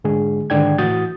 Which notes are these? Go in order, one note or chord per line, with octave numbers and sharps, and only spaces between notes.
G#2 D3 G#3 G#4
G#2 D3 D#3 D5 G5 G#6
A2 E3 F#4 D#6 G6 A6